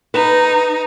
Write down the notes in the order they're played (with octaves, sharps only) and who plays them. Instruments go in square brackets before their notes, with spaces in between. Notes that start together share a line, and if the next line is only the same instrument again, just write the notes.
[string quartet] D#4 [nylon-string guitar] B4